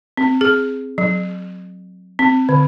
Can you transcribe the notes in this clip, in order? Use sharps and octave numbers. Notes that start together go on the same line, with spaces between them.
C4
G#4
F#3
C4
D3